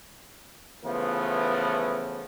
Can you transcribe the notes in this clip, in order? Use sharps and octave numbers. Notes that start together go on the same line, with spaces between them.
C#3 E3 F3 A3 B3